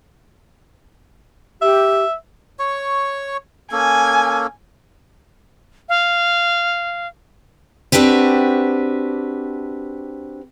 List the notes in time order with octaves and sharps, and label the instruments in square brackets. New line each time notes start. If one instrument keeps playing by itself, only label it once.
[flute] G4 [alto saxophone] E5
[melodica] C#5 C#6
[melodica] A#3 C#4 A4 [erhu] G#5
[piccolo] F5
[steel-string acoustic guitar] C4 D4 F#4 G4 B4